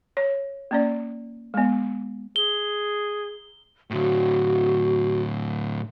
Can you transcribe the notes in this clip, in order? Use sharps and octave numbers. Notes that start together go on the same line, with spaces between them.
C#5
A#3 C#4 D5
G#3 B3
G#4 G7
A2 D3 F#4